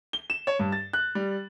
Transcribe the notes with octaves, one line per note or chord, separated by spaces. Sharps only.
G7
E7
C#5
G2
A6
F#6
G3